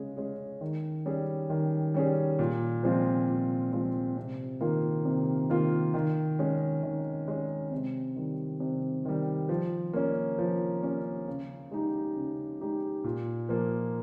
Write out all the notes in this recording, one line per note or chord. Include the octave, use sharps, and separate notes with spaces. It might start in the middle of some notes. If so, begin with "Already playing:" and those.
Already playing: C#3 G#3 C#4 G#4
G#3 C#4 G#4
D#3
G3 C#4 G#4
D#3
G3 C#4 G#4
A#2
F3 G#3 C4 F4
A#2
F3 G#3 C4 F4
C3
D#3 A#3 F4
C3
D#3 A#3 F4
D#3
G#3 C#4
D#3
G#3 C#4
C3
D#3 G3
C3
D#3 G3
F3
A#3 C#4
F3
A#3 C#4
C#3
G#3 D#4 G4
C#3
G#3 D#4 G4
A#2
F3 A#3